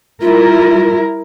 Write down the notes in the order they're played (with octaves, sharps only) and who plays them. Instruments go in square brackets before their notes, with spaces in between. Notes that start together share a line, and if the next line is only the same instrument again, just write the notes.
[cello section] G3 E4 A#4 [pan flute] F4